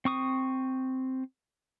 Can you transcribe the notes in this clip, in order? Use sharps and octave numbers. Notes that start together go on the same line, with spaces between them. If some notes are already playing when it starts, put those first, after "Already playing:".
C4 C#6 D#6